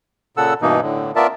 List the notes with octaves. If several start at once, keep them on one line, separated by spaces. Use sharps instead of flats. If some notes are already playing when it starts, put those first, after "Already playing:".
A#2 C#3 A4 F#5 E6
G2 B2 E3 A#3 D#4
A2 D3
B3 F4 A#4 D5 E5 A5